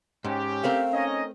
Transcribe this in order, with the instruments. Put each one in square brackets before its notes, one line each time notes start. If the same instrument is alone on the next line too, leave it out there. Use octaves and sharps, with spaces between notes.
[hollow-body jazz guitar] G#2 [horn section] C#4 G4
[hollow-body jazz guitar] A3 C4 A#4 [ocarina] F5
[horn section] C#4 D#4 D#5